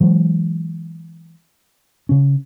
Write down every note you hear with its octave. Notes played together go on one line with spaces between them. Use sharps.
E3 F#3 G#3
C#3 C#4